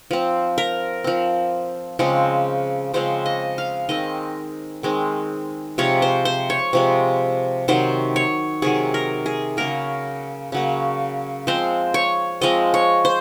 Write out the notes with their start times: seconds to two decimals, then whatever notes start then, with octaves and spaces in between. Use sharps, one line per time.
0.11 F3 C4
0.58 A#4
1.04 F3 C4
1.99 C#3 F3 G#3 C4
2.94 C#3 F3 G#3 C4 C5
3.26 D#5
3.58 F5
3.89 D#3 G#3 C4 D#5
4.83 D#3 G#3 C4
5.78 C3 F3 G#3 C#5
6.02 C5
6.25 C5
6.50 C#5
6.73 C3 F3 G#3
7.68 C3 D#3 F#3 C5
8.16 C#5
8.62 C3 D#3 F#3 G#4
8.94 A#4
9.26 G#4
9.57 C#3 F#3 A#3 A#4
10.52 C#3 F#3 A#3
11.47 F3 G#3 C4 C5
11.94 C#5
12.41 F3 G#3 C4 D#5
12.74 C#5
13.05 C5